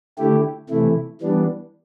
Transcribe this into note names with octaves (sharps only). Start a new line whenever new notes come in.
D3 A3 E4 G4
C3 E3 A3 E4
E3 G3 B3 D4